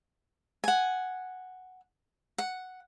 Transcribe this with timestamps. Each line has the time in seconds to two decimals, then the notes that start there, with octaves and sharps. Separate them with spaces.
0.64 F#5 G#5
2.38 F#5